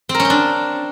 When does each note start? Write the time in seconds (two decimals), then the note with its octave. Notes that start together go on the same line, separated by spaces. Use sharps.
0.09 C4
0.14 A#4
0.20 C#4
0.25 C4
0.30 D4